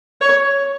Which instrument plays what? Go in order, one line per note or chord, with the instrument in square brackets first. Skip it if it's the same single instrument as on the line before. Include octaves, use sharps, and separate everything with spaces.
[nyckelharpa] C#5